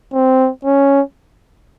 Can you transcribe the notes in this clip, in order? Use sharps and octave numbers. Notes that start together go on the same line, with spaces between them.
C4
C#4